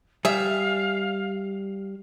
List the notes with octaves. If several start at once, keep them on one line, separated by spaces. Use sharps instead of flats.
G3 G#4 E5 F5